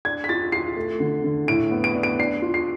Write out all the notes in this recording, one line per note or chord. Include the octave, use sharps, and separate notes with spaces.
D4 G#6
B6
F4 A6
F4 C7
A3
D3
D3
A2 D7
B3
D7
D4
D7
D4 C7
F4
C7